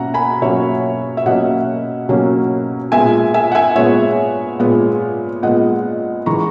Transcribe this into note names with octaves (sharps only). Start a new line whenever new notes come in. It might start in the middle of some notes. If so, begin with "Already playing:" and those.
Already playing: B2 F#3 A#3 C#4 E5 F#5 A#5
G#5 B5
B2 F#3 A#3 C#4 C#5 E5
E5
B2 F#3 A#3 C#4 D#5 F#5
B2 F#3 A#3 C#4
A#2 G#3 B3 E5 G#5
E5 G#5
F#5
E5 G#5
A#2 G#3 B3 C#5 E5
A#2 G#3 B3
A#2 G#3 B3 D#5 F#5
E3 G#3 A#5 C#6